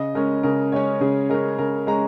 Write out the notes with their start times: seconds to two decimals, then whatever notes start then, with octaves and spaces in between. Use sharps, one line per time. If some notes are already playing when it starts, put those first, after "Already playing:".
Already playing: C#3 D#5
0.15 G#3 C#4 A#4
0.43 C#3 A#4
0.72 G#3 C#4 C#5
1.01 C#3 G#4
1.30 G#3 C#4 A#4
1.58 C#3 A#4
1.87 G#3 C#4 A#5